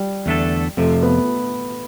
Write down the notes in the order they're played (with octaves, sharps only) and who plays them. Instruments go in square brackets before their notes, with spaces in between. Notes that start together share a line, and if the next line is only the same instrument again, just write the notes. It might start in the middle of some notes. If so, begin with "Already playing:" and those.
Already playing: [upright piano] G3
[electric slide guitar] E2 D3 A3 D4 A4
[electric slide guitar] F2 C3 F3 [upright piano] A3
[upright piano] B3